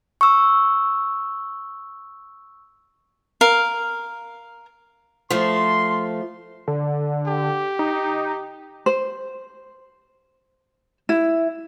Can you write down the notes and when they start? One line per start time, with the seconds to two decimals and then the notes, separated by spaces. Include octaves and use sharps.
0.21 C#6 E6
3.41 A#4 F5
5.30 F3 A3 C6
6.68 D3
7.27 G4
7.79 D#4
8.86 C5
11.09 E4